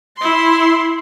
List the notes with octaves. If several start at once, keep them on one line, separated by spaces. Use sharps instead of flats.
E4 C6